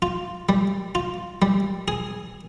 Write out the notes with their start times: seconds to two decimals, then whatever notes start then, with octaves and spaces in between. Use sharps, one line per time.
0.02 F4
0.49 G3
0.95 F4
1.42 G3
1.88 G#4